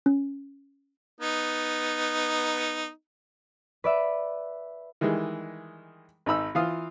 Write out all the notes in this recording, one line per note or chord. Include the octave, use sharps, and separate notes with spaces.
C#4
B3 D#4
B4 D5 E5
D#3 E3 G3 G#3
G#1 D#4 B5 E6
E3 F4 F5 D#6